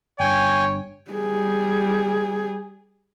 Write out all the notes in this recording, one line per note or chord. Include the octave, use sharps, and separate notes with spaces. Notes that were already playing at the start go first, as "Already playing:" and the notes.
G1 G2 C#5 G5 G#5
G3 G#4